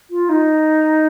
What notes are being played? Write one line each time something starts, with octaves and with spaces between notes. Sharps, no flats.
F4
D#4